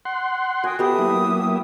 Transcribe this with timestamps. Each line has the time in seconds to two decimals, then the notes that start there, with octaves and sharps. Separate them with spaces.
0.05 F#5 C6
0.64 F#4 G5 G#5 D#6
0.79 B3 G4 A4 E5 D#6
0.99 F#3 A#3 E4